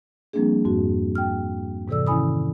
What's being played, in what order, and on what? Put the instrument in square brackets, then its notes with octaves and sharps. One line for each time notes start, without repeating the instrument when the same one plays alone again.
[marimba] F3 G3 A#3 C4 D4 G#4
F2 G#2 F#4
G5 F6
G#2 C3 E3 A4 D5 E6
D#3 C#4 E4 G#5 B5 D#6